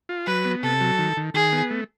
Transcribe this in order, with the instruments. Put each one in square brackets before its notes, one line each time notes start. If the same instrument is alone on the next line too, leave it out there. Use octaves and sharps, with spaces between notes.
[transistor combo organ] F4
[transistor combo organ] F#3 [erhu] B4
[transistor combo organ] B3
[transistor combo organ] C3 [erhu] A4
[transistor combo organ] F#3
D#3
D#3
[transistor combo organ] D#3 [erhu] G#4
[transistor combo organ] B3
A3